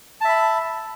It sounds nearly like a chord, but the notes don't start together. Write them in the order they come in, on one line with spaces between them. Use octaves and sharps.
A5 E5 B5